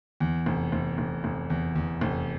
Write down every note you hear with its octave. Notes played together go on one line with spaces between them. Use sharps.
E2
F1
F1
F1
F1
E2
E2
F1